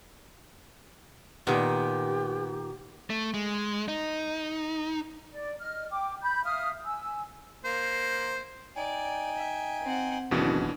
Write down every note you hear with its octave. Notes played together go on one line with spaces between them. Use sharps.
A#2 D#3 B3 G4
A3
G#3
D#4
D5
D#5 F6
G5 D6
B5 G6
E5 F5 D#6 F6
G#5 E6
A#3 C5
D#4 D5 G5 G#5
E5
C4 F#5
F#1 D#2 B2 E3 D4